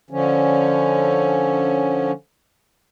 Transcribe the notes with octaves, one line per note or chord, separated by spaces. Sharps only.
D3 F3 C#4